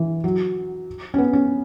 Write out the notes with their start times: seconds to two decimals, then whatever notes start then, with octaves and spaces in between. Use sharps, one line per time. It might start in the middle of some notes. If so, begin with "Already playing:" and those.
Already playing: E3
0.24 F#3
1.14 C#4
1.18 B3
1.33 C#4